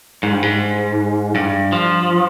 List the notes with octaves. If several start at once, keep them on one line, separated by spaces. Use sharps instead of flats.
G#2
G2
G#2
G2
F3